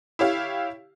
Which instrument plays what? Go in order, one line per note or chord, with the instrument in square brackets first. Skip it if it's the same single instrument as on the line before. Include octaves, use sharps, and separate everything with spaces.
[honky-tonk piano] E4 G4 C#5 F5